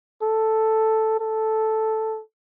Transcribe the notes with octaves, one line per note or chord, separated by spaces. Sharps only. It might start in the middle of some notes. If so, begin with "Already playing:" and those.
A4
A4